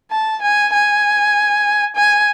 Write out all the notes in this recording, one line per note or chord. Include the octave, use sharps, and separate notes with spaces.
A5
G#5
G#5
G#5